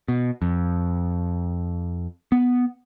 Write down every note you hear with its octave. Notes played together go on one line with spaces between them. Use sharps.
B2
F2
B3